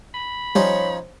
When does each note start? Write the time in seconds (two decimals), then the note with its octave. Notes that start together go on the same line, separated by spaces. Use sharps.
0.14 B5
0.55 F3 G3 C#4 D#4 C#5